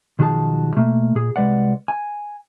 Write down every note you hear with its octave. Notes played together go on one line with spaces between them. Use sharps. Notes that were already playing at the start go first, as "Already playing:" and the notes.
B1 D#3 F3 F#4 G#4 A5
B2 A3 A#3
A#2 G#4
C2 G#3 B4 D5 F#5
G#5